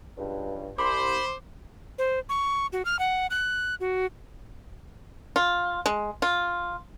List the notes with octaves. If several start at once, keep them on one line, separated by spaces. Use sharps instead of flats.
C#2 G2
C2 C5 B5 C6 D6
C5
C#6
F#4
F6
F#5
F#6
F#4
F4
G#3
F4